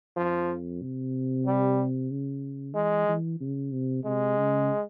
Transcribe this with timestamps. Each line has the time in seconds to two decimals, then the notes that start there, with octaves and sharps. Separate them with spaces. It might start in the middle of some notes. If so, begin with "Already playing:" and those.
0.17 F2 F3
0.82 C3
1.46 G3
2.10 C#3
2.75 E3 G#3
3.08 E3
3.40 C#3
3.72 C3
4.05 C3 G#3
4.37 C#3